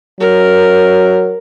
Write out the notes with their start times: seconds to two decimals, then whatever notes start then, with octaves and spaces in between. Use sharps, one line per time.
0.20 F#3 A#4